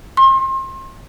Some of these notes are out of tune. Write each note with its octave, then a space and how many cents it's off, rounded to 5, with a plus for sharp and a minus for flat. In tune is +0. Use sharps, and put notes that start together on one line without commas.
C6 +35